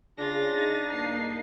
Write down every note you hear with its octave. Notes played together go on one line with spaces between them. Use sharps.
C#3 D4 F4 G#4 A6 A#6
D#4
G2 A#3 A5 C7